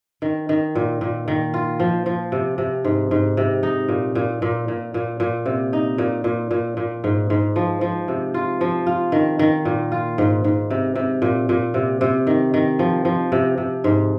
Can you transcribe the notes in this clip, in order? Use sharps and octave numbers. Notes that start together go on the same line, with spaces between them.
D#3
D#3
A#2
A#2
D#3
F4
F3
F3
C3
C3
G#2
G#2
C3
D#4
A#2
A#2
A#2
A#2
A#2
A#2
C3
D#4
A#2
A#2
A#2
A#2
G#2
G#2
F3
F3
C3
F4
F3
F4
D#3
D#3
A#2
F4
G#2
G#2
C3
C3
A#2
A#2
C3
C3
D#3
D#3
F3
F3
C3
C3
G#2